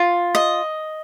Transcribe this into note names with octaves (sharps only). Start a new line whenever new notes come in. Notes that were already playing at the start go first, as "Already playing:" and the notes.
Already playing: F4
D#5